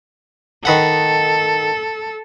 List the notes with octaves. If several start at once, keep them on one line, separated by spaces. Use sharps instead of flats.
D#3 A4 B4 F#5